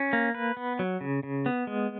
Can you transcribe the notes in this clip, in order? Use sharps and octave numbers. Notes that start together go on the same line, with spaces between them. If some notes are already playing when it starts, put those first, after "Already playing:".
Already playing: C#4
A#3
B4
B3
F#3
C#3
C#3
B3
G#3